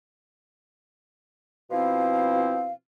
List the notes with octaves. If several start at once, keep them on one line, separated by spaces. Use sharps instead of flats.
B2 F3 C4 E4 F5